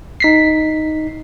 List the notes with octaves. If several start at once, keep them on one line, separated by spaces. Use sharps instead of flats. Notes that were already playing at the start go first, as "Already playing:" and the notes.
D#4 B6 C7